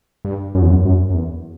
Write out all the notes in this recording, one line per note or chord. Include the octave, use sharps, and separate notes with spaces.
G2
F#2
E2
F#2
F#2
F#2
E2